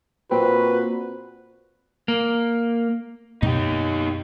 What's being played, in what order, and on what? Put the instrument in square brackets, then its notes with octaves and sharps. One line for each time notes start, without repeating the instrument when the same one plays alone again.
[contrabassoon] A#2 [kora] C4 [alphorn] F#4 [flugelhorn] B4
[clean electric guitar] A#3
[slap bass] F#2 B2 A#3 [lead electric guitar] D#4 G4